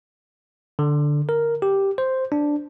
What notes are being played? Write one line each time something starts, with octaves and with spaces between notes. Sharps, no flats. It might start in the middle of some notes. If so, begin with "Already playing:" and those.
D3
A#4
G4
C5
D4